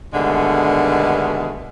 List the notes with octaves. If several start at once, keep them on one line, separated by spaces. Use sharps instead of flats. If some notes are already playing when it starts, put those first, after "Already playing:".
G2 B2 D3 D#3 G#3 A3